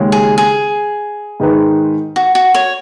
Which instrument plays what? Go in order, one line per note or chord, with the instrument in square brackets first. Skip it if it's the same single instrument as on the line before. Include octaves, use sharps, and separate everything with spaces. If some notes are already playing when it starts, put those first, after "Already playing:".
Already playing: [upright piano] D#2 C#3 G#3 C#4
[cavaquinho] G#4
G#4
[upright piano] G#2 D#3 G#3 D#4 B4
[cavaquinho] F#4
F#4
C#5